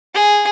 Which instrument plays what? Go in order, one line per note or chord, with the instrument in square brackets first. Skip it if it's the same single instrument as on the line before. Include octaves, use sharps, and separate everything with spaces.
[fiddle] G#4